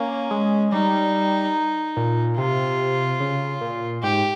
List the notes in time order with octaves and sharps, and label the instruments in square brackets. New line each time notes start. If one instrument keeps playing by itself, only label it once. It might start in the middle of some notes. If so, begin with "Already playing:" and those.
Already playing: [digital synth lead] A#3 [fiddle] C#4
[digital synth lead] G#3
[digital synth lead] G3 [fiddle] D#4
[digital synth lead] A#2
[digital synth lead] C3 [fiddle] F4
[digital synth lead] C#3
A#2
[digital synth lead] G#2 [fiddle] G4